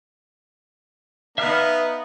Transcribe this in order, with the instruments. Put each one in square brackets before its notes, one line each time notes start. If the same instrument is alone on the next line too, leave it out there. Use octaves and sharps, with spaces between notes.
[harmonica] B3 D#4 [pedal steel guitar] E5 F5 F6